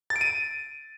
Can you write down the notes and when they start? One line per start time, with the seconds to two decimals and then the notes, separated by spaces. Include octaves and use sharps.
0.10 A6
0.16 D7
0.21 D#7